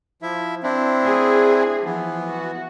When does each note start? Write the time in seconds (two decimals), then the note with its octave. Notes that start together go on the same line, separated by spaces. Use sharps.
0.22 F3 E4 E5
0.63 C4 D4 E4
1.04 G#4
1.85 E3 F3 B3
2.30 F#4